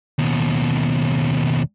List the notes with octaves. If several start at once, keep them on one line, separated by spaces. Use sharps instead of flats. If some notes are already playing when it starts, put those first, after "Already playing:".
D#2 B2